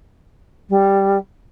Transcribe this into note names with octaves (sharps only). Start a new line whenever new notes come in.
G3